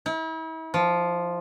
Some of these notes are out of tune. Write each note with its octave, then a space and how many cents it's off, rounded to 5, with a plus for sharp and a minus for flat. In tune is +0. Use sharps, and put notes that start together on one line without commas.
E4 -40
F3 +0